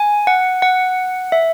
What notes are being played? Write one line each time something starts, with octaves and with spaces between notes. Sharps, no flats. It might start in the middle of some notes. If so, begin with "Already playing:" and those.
Already playing: G#5
F#5
F#5
E5